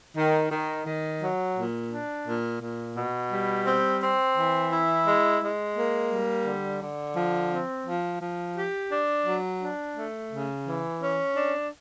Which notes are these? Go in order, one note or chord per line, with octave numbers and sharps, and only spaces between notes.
D#3
D#3
D#3
F#3
A#2
D4
A#2
A#2
B2
G3
C4
C4
E3
E4
G#3
G#3
A#3
G3
D3
D3
F3
C4
F3
F3
G4
D4
F#3
D4
A3
C#3
E3
C#4
D4